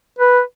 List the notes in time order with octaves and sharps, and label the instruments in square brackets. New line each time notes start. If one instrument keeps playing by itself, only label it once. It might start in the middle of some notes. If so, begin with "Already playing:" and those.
[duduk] B4